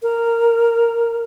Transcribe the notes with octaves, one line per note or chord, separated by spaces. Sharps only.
A#4